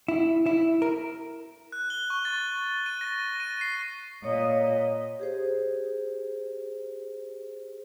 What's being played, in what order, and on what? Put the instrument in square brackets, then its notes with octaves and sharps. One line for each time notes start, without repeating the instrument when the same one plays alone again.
[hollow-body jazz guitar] E4
E4
A#4
[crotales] F#6
G7
C#6
A6
D#7
A#6
D#7
C7
[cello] A#2 D#5 [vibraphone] C#5
[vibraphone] G4 G#4 C5